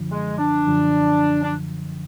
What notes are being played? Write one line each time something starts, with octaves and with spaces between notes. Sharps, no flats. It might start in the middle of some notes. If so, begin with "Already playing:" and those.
Already playing: F#2 D3 F3
G#3
D4
F#2 D3 F3
D4